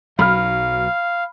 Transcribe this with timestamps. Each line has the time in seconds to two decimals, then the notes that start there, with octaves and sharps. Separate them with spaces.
0.19 B1 F#3 F5 B5 F6